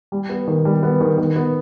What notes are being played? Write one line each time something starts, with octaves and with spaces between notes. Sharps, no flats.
G3
B3
D#3
G3
B3
D#3
D#3
B3